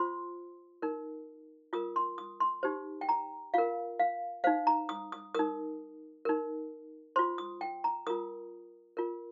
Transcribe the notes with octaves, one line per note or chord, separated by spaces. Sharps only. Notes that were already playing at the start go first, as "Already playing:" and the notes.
Already playing: F4 C5 C6
D#4 A#4
F4 A#4 D#6
C6
D#6
C6
D#4 G4 C5
G5
A#5
F4 A#4 F5
F5
D#4 C5 F5
A#5
D#6
D#6
D#4 A#4 D#6
D#4 A#4
F4 C5 C6
D#6
G5
A#5
F4 A#4 D#6
F4 A#4